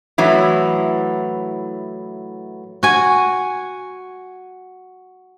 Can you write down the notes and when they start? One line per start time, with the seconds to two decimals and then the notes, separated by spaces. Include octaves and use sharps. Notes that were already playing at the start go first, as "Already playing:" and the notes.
0.18 A2 E3 F#3
2.83 F#4 G#5